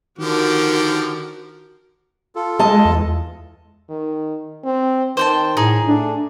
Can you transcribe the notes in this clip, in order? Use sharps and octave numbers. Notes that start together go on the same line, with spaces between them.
D3 D#3 F3 F#4 G4 A#4
F4 A4
G#3 D#5 A5
E2
D#3
C4
D#3 C5 G5 A5
A2 D#4 G#4
A3 D4